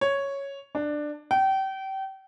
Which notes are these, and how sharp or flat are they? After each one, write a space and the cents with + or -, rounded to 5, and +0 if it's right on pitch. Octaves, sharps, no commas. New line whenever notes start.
C#5 +0
D4 +15
G5 -30